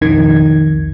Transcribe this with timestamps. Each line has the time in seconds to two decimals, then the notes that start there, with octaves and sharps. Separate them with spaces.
0.01 B1 F2 D#3 G#6